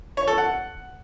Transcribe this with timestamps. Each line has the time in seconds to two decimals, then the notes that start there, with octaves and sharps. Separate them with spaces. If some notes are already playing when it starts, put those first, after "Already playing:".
0.17 C#5
0.28 A4
0.38 F#5